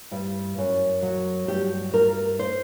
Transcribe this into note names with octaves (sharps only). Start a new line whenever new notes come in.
G2
F#2
F#3
G2 G4
G2 A#4
C5